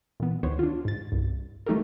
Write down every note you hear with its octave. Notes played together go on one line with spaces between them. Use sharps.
A#2 E3 B3
D2 D#3 B3 C5 C#5
D4 F4
G#2 A6
C2 G2
F#3 A3 D#4 G4 A4 A#4